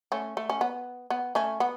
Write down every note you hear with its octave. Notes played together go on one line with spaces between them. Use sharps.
A3 C#4
A3
C#4
B3
B3
A3 C#4
B3